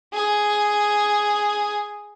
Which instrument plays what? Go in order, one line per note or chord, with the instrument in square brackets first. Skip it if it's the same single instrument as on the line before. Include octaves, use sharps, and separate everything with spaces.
[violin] G#4